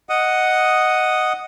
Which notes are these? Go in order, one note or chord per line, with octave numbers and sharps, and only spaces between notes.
D#5 F#5 D#6